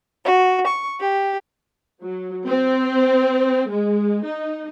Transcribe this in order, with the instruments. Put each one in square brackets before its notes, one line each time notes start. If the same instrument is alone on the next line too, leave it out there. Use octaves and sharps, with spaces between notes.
[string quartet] F#4
C#6
G4
[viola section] F#3
C4
G#3
D#4